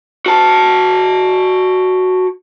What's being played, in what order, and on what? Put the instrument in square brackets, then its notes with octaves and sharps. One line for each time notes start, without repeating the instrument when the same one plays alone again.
[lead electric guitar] F#4 A5